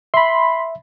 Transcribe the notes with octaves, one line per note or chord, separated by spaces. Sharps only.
E5 B5 C6